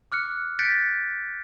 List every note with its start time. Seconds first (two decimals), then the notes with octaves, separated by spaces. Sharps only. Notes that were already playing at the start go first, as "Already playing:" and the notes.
0.12 D6 F6 F#6 C#7
0.59 F#6 G6 A6 B6 C#7 D7